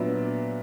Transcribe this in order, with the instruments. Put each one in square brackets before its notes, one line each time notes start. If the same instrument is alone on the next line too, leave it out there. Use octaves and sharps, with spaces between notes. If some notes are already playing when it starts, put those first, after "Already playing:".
Already playing: [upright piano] A#2 F#3 B3 D4 E5